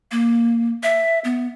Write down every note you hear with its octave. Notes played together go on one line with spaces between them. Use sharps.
A#3
E5
B3